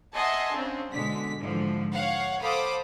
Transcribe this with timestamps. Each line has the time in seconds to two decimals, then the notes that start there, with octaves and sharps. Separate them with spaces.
0.14 D#5 E5 F#5 G#5 A5 C6
0.55 C#3 C4 D4
0.92 B2 D3 G#3 B6
1.38 G#2 D3 E3 F3
1.92 C#5 F5 F#5
2.41 A4 C5 F5 B5 D6 D#6